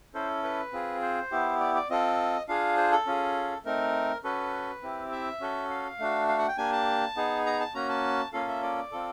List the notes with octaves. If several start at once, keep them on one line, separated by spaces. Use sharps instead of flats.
C#4 E4 A4 C5
B4
C4 F4 G#4
C5
B3 E4 G4
D5
D5
C4 F4 A4 D#5
D4 F4 G#4 F5
C5
A4
C#4 F4 G#4
A3 C4 D#4 A#4
C#4 F#4 A4 B4
C4 E4 G4
E5
C#4 F#4 A4
F5
A3 D4 F#4
F5
F#5
G5
A#3 D4 G4 G#5
A5
B3 D#4 G#4
A#5
A5
A#3 C#4 F#4 A#5
A5
A#3 C#4 F4 A4 F5
E5
D5
C4 F4 A4